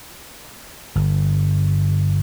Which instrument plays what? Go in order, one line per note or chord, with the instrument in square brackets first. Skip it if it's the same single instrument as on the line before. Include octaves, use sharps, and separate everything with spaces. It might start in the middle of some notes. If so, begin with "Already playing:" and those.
[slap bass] G1